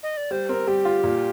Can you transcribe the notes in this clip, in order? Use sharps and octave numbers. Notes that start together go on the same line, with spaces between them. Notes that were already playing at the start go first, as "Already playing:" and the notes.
D#5
D5
G3 C5
C4 A#4
G3 G4
F4
A#2